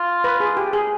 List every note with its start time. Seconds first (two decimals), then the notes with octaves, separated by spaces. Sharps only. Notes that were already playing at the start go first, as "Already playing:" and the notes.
Already playing: F4
0.24 B4
0.40 G#4
0.57 G4
0.73 G#4